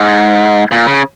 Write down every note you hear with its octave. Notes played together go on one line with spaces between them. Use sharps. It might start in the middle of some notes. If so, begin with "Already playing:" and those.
Already playing: G#2
A#2
C#3